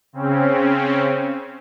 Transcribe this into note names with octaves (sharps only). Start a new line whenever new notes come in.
C#3 C4 C#4